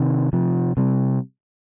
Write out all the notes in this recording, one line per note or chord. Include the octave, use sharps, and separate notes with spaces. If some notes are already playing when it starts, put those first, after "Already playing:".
Already playing: C3 D#3
C3 F3
C3 G3